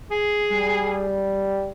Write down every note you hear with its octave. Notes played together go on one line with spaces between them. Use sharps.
G#4
G3